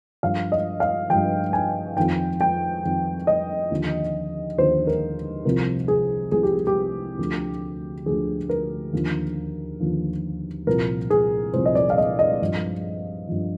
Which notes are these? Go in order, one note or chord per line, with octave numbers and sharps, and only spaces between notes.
G2 F3 F5
D#5
F5
G2 F3 G5
G#5
F2 D#3 G5
G5
F2 D#3
D#5
D#2 D3 F3
D#2 D3 F3 C5
A#4
C2 C3 F3 A#4
G#4
C2 C3 F3 G#4
G4
G4
D2 D3 F3
D2 D3 F3 G#4
A#4
D#2 D3 F3
D#2 D3 F3
C2 A#2 F3 A#4
G#4
C2 A#2 F3 C5
D#5
D5
F5
D#5
D#5
G2 F3
G2 F3